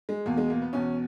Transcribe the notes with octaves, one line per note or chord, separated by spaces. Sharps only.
G#3
E2 B2 A#3
G#3
A#3
B3
E2 B2 C#4